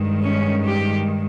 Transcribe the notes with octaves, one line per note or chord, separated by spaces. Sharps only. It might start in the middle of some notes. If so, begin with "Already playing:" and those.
Already playing: G2 D#3 G#3
C#4
G4